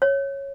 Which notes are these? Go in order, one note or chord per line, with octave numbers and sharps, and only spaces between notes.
C#5